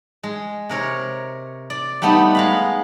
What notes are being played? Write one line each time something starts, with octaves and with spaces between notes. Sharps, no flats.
G#3
C3 A#4 C#5
D5
G3 A3 B3 D#4
G#3 F5 B5